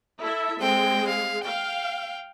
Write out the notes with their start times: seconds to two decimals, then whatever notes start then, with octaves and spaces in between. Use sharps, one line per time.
0.20 E4 A4 E5
0.60 G#3 C4 G5
1.08 F5
1.45 F5 G5